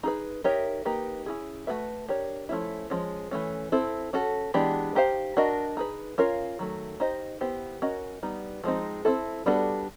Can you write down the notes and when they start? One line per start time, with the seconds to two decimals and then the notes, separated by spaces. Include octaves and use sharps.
0.03 D#4 G#4 B4
0.44 D#4 G4 A#4 C#5 E5
0.85 A#3 D#4 G4 B4
1.26 C#4 E4 G#4
1.67 A3 C#4 F#4 B4 E5
2.08 D4 G4 A#4 C#5
2.49 F3 A3 C#4 E4
2.90 F3 G#3 C#4
3.31 E3 A3 C#4
3.72 C4 E4 A4
4.13 C#4 F#4 A4
4.54 E3 G#3 B3 D4 G4
4.95 D#4 G4 C5 F5
5.37 D4 F#4 A#4 D#5
5.77 D#4 G#4 B4
6.18 C#4 F4 A#4 C#5 F5
6.59 D#3 F#3 A3
7.00 D#4 G4 C5 D#5
7.41 B3 E4 G4 C5
7.82 C#4 F#4 A#4 D#5
8.23 G3 B3 D#4
8.64 F3 G#3 C4 D#4
9.05 C4 E4 A4
9.46 G3 B3 D4 F#4 A4